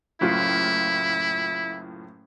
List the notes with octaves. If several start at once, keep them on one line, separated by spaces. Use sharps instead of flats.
F#1 A2 E4 F4